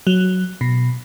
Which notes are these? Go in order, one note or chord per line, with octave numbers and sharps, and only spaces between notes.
F#3
B2